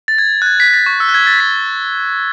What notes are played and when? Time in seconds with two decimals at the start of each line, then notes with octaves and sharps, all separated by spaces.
0.08 A6
0.18 G#6
0.42 F#6
0.46 G#6
0.60 B6
0.68 G#6
0.74 A6
0.86 C#6
1.00 E6
1.09 F#6
1.14 G#6
1.27 A6
1.40 B6